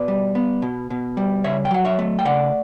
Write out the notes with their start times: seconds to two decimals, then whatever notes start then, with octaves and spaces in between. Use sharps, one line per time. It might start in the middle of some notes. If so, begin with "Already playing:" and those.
Already playing: B2 B4 D5
0.08 G3
0.35 B3
0.62 B2
0.90 B2
1.17 G3
1.44 C#3 C#5 E5
1.65 G5
1.71 F#3 F#5
1.85 C#5 E5
1.99 A3
2.19 G5
2.25 C#3 D5 F#5